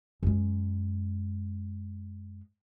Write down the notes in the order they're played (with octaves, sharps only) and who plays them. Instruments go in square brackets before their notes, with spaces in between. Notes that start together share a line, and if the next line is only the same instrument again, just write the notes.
[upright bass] F#2 G#3